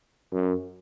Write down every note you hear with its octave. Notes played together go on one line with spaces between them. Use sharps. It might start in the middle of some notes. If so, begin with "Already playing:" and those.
F#2